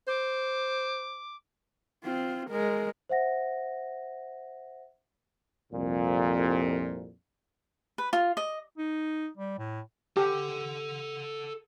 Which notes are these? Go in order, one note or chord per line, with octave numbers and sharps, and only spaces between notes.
C5 D6
C4 F4
G#3 A#4
C5 E5 F#5 A#6
C2 F2 A#2
B4
F4
D#5
D#4
G3
A2
G4 A4 F#5